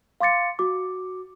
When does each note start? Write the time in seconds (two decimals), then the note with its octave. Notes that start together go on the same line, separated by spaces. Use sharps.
0.20 F5 C6 D6 A6 C#7
0.59 F#4 D6